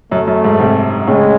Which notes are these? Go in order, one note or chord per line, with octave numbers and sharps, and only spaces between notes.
F#2 A3
F#2
G#2
G#2 C3
A2 C#3 G#3